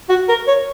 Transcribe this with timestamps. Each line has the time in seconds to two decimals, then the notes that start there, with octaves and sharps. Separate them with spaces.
0.09 F#4
0.29 A#4
0.48 C#5